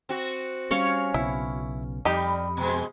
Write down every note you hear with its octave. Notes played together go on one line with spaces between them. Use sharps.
C4 F#4
G3 C#4 C#5 F5
B1 C#3 B3 E4
F2 G3 D#4 G4
B2 G#3